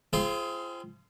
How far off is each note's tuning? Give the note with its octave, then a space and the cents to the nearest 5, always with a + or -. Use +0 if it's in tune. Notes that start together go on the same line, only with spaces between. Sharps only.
C4 +0 F4 -30 G#4 +20